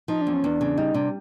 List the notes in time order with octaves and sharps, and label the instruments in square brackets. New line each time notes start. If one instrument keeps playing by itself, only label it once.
[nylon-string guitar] F3 [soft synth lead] D#4
[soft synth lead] D4
[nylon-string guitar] E2
[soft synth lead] C#4
[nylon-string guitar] E2 [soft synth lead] D4
[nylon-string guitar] C#3
[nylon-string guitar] G3 [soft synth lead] D#4
[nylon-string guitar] C3 [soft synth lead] D4